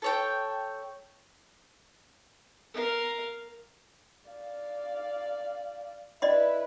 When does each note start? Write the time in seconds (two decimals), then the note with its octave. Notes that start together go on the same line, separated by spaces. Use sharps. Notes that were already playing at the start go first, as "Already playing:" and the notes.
0.02 A4 C#5 G5
2.74 A#4 F5
4.30 D5 F5
6.22 E4 B4 D5 D#5 C6